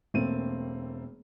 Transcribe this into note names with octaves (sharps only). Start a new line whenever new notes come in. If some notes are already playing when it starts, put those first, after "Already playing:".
E1 A3 A#3 C4 D#7